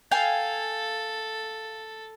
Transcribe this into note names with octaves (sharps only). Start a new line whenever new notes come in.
A4 F5 G5 G#5